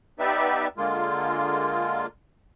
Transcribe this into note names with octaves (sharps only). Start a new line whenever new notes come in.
B3 D#4 G4 B4 D5 E5
D3 G#3 A#3 F4